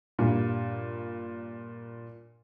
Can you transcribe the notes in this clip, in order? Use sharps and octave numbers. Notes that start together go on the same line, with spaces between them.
G2 A#2